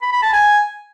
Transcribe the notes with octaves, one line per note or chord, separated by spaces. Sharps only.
B5
B5
A5
G#5